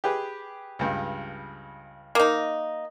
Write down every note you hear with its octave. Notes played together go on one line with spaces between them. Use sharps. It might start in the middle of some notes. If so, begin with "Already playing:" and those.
G4 G#4 B4
C#2 G2
A#3 D#4